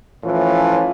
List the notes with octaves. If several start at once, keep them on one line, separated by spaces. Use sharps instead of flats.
A2 E3 F3 C#4 F4